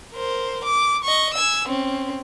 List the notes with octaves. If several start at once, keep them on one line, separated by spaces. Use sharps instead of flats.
A#4 C5
D6
D#5 C#6
G#5 E6
C4 C#4